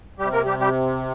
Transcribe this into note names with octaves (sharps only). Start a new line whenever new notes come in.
C3 G3 G4
A#3 A#4
G3 G4
G3 G4